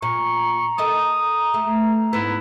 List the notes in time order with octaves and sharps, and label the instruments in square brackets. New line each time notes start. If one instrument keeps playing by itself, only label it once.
[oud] A#2 [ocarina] A#5 [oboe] C#6
[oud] A4 A#4 D#5 [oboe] D#6
[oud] A3
[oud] G#2 B3 [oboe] E4